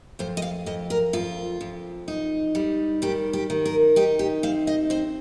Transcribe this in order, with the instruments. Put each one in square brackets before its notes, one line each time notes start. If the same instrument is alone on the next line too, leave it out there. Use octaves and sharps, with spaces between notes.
[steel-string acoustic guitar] F2 C5
D#5
F5
F2 D#5
A#4
F2 F4
F2
D#4
G3
D#3 G4
G4
D#3
A#4
D#4 G4
G4
C4 F5
D#5
C4 C5